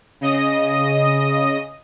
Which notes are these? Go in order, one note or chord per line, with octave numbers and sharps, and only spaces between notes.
C#3 D#5 D#6